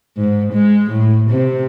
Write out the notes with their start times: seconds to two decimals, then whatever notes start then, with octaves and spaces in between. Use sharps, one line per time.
0.17 G#2
0.53 G#3
0.90 A2
1.30 C3